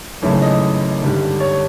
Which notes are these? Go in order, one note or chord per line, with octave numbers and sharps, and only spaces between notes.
G#1 F#2 C#3 E3 A3
D#5
G#1 G2 D3 G3
C#5